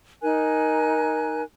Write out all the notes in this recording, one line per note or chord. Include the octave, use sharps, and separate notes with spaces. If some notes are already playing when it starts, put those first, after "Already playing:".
D#4 A#4 G#5 F#6